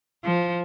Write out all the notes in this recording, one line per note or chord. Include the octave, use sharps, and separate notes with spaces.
F3